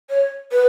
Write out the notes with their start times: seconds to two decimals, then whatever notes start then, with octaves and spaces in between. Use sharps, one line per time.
0.10 C#5
0.52 B4